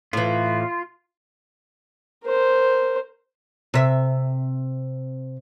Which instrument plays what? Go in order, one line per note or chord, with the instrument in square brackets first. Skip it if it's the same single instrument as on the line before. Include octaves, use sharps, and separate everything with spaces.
[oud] A2 E3 [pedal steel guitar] F4
[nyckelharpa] A#4 C5
[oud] C3 E5